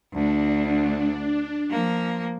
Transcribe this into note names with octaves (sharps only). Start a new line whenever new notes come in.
D2 D4
F3 A#3